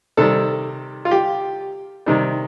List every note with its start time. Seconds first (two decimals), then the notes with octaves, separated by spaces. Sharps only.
0.17 C3 D#3 G3 A4
1.05 F4
1.11 G4
2.06 C3 D#3 G3